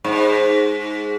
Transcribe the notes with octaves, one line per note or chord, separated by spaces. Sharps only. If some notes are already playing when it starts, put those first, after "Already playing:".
G#2